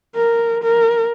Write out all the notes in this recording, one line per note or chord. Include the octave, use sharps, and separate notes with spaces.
A#4
A#4